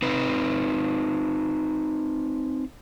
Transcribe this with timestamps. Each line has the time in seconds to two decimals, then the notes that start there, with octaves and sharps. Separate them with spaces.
0.02 C4 D#4 B4